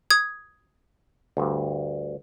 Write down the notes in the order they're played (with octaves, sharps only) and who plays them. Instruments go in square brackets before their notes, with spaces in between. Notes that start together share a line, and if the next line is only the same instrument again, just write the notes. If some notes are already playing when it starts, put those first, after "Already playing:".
[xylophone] D#6 G#6
[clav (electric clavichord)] D2 G2